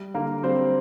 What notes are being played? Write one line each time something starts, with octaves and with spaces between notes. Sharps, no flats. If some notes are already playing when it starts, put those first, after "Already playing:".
Already playing: G3
D3 A#3 A#4
G3 C4 C5